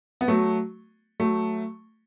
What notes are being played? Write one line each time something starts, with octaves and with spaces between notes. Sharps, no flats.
B3
F#3 A3
F#3 A3